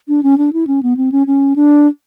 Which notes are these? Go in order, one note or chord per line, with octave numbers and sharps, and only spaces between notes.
D4
C#4
D4
E4
C#4
B3
C4
C#4
C#4
D4